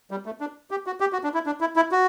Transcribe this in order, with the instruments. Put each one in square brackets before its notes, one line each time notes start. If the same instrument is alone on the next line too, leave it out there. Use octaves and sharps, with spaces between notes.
[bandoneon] G3
A3
D4
G4
F#4
G4
F#4
D4
E4
D4
E4
E4
F#4